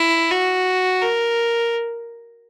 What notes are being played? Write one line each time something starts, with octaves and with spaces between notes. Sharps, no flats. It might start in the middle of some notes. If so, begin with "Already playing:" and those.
Already playing: E4
F#4
A#4